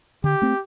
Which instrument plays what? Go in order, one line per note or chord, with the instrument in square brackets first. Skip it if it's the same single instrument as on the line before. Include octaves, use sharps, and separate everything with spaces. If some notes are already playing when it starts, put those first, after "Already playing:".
[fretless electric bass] D3 [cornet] G4
[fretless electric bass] A3 C4